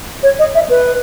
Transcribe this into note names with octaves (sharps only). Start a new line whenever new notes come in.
C#5
D#5
E5
B4